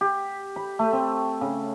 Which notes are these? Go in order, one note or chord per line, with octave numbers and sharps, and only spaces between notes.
G4
B5
A3
C4
C#3